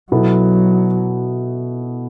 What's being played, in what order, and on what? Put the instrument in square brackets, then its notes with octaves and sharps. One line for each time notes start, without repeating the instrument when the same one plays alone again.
[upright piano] B2 B3 E4 A4 [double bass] F#3